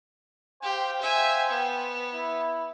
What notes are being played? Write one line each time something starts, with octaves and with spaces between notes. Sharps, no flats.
G4 C5 F5 G5
E5 G#5
B3
E4